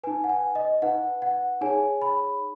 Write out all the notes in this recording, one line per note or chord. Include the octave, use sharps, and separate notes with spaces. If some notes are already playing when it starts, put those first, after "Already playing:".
D#4 B4 G#5
F#5
G#5
D#5
D#4 B4 F#5
F#5
D#4 G#4 C#5 G#5
B5